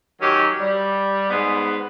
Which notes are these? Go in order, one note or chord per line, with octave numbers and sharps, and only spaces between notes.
D#3 F#3 C#4 G4
G3
G#2 B3